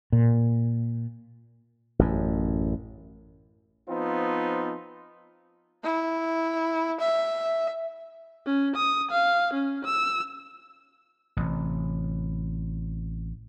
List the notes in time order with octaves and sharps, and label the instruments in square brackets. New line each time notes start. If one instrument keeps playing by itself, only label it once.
[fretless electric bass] A#2
[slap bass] A1 F#2
[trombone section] F3 B3 C4 D#4 F4
[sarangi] E4
E5
[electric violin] C#4
D#6
F5
C#4
E6
[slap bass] A1 C3